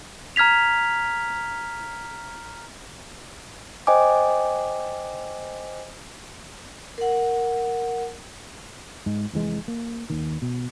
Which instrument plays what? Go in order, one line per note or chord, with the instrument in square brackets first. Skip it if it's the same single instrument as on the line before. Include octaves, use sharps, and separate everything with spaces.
[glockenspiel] A#5 F6 G#6 B6 F7
[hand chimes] C5 D#5 G5 G#5 D6
[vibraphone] A#4 F#5
[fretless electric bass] G#2 G#3
F1 E3 G#3
A#3
D#2 D#3
B2